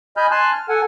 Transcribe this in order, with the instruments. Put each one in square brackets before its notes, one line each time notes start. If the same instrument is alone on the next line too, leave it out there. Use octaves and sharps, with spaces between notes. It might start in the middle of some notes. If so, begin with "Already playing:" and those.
[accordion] D#5 G#5 B5 F6 G6
G#5 A5 C6 F#6
F6
A4 F#5 G#5